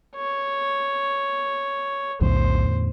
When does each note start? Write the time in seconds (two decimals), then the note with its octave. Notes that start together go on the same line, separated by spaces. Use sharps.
0.16 C#5
2.21 B1 E2 A2 D3 C5